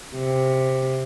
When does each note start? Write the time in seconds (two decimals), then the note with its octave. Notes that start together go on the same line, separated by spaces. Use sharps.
0.16 C3